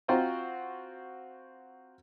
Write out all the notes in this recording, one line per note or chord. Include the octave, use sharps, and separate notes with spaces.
C4 F4 F#4 C5 G5 A#5